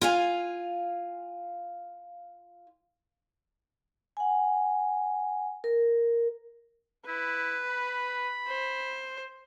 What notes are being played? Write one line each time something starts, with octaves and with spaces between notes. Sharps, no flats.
F4 F5 G#5
F#5 G#5
A#4
E4 B4
B5
C5